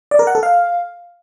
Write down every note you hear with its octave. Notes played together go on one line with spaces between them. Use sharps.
D5
A#4
F#5
A4
F5